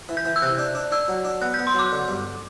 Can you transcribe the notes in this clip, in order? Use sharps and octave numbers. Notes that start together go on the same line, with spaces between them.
E3
G6
E3
E6
C3 F#6
D4
D4
D4 E6
F#3
D4
B3 F#6
G6
B3
C6
F#3 D6
D3
G2